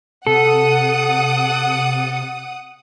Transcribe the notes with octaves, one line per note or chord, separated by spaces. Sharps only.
C3 A4 F#5 D#6